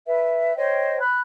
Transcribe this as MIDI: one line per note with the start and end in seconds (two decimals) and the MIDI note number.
0.06 0.53 71
0.06 0.53 76
0.56 0.99 72
0.56 0.99 73
0.56 0.99 75
0.56 0.99 79
1.00 1.21 83
1.00 1.21 90